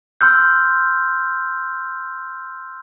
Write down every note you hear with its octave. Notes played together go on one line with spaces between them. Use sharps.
C6 E6 F6 G6